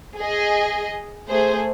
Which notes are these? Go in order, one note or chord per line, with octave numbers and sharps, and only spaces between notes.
G#4 D#5
A3 G#4 C5